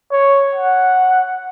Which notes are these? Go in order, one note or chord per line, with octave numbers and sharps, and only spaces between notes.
C#5
F#5